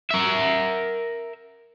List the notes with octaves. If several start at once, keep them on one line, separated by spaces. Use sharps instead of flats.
A#4 E5